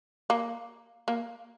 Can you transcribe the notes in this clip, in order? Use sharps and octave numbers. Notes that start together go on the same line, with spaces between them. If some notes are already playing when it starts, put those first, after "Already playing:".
A#3
A#3